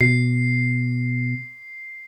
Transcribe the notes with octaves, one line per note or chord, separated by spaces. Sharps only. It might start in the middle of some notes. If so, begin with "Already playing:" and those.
B2 C7